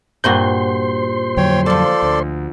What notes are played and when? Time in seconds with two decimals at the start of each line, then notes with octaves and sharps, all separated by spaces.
0.24 G2 A#2 F#4 C5 C6
1.37 F2 D3 F#3 C#5 G5
1.66 F3 A4 D5 A5
2.02 D2